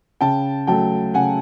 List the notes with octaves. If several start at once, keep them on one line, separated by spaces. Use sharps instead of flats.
C#3 G5 A5
F#3 A3 G5 A5
C#3 F#5 G#5